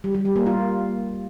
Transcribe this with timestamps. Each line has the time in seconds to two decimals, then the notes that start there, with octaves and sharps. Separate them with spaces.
0.04 G3
0.15 G3
0.25 G3
0.36 A#3
0.46 F4